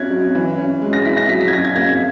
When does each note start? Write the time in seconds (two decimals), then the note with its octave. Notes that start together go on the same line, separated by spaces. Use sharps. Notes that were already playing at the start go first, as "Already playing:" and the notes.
Already playing: C#4 E4 F#6 G#6 A#6 B6
0.10 F#3
0.35 E3
0.58 C#4
0.81 G#3
0.93 A#6
1.05 E4 B6
1.17 A#6
1.29 F#3 B6
1.41 B6
1.48 G#6
1.52 C#4 A#6
1.65 G#6
1.75 A#3 G#6